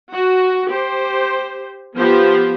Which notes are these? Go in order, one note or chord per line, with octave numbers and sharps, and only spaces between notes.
F#4
G4 C5
F3 B3 G4 C5